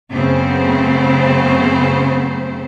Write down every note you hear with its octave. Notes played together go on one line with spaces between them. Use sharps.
F#2 C#3 A3 B3 C4 C5